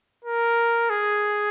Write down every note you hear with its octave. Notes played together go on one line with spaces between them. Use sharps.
A#4
G#4